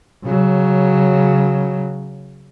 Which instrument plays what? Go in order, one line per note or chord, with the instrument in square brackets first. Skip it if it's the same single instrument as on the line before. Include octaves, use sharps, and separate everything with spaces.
[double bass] C#3 F#3